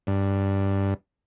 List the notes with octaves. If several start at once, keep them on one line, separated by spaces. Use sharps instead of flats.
G2